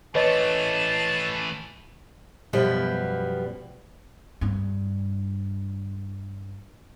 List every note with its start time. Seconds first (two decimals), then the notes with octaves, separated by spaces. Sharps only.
0.15 E3 A3 B4 C#5 D#5 A5
2.53 F#2 B2 F3 G3 B3
4.41 G2 C4